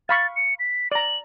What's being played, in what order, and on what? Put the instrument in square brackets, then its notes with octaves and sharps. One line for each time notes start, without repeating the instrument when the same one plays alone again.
[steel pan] F5 B5 C#6 [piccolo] A6
[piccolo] C#7
B6
[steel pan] D5 A#5 [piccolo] F#7